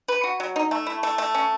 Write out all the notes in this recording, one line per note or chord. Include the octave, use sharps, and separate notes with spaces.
B4
F#4
F#3
D#4
A3
E4
A3
A3
C#4